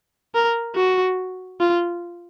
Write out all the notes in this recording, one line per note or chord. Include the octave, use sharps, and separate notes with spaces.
A#4
F#4
F4